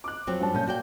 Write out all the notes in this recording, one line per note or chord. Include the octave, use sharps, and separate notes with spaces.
D6 F#6
F2 F#3 C4
G2 G3 A5
A#2 C#4 G6
F#4 D5 G5